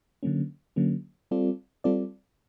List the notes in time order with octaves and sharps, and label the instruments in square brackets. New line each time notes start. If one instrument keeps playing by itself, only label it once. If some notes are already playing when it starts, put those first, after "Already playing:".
[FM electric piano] D3 F#3 A#3 C#4
D3 F#3 A#3 C#4
G3 C4 F4 A4 D5
G3 C4 F4 A4 D5